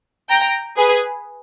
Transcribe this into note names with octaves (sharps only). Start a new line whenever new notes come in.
G5 A#5
G#4 B4